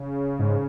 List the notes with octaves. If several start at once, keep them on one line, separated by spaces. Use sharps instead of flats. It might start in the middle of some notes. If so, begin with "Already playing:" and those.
Already playing: C#3
G#2